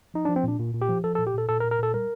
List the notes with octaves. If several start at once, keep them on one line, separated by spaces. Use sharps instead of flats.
F3 D#4
D4
F3
C4
A#2 D4
A#2
A#2
G4
F3
F3 A4
A4
A#2
G4
A#2 A4
A#2 A4
A#4
A#2
A#4
A#2 A4
G3 A#4